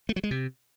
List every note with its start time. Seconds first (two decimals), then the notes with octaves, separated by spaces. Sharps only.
0.09 A3
0.16 F#3
0.24 G#3
0.31 C3